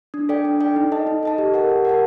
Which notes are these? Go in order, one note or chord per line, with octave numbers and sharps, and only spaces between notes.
D4
A4 D5 G5
D4
A4 D5 G5
D#4
A4 D#5 A5
D#4
A4 D#5 A5
G4
A#4 F#5 A5
G4
A#4 F#5 A5